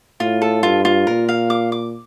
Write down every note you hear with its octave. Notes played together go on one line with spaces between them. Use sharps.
A2 F4
A4
G2 F4
F4
A#2 A#4
F5
D6
D6